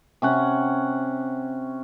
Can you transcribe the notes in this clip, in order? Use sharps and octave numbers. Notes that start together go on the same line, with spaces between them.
C3 C#4 F#5